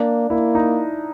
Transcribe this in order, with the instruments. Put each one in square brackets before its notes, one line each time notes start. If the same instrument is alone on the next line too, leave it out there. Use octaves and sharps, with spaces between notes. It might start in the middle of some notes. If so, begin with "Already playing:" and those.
Already playing: [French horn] A#3 [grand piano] D4
[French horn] A#3 [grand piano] E4
[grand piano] D#4